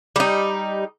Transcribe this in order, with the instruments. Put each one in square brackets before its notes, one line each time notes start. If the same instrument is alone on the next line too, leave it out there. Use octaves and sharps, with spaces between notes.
[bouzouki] G3 D#4